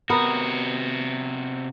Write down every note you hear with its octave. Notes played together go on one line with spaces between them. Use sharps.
C3 B3 F#4 A#4